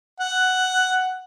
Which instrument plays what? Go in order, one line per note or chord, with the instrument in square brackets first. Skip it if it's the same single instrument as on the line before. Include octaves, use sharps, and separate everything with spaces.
[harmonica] F#5